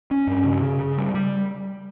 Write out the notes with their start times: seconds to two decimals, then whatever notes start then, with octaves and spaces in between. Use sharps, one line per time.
0.11 C#4
0.27 G2
0.45 C#3
0.62 C#3
0.80 C#3
0.98 G3
1.14 G3